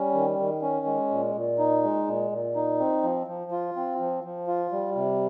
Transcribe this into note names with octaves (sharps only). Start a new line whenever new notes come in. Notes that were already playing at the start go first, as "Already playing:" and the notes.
Already playing: G3 C#4
D#3
D#3
C#4
G#3
A#2
A#2
D#4
G#3
A#2
A#2
D#4
C4
F3
F3
F4
C4
F3
F3
F4
G3
C3